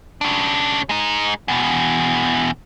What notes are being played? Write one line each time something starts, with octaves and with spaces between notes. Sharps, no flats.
C#3 D4
G#3 D#4
E2 B2